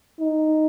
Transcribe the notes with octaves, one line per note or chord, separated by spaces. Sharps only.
D#4